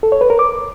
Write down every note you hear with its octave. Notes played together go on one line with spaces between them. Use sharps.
A4
C#5
B4
A#4
D6